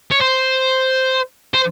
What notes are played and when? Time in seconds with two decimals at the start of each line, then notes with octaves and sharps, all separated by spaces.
0.12 C#5
0.21 C5
1.55 C5